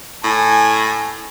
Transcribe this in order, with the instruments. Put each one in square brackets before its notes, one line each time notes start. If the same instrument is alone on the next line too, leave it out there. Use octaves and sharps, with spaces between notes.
[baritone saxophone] A2 [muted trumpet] G#5